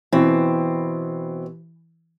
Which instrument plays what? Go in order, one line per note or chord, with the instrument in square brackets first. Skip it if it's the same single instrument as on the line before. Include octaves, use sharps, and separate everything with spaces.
[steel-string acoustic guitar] B2 C4 [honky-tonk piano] E3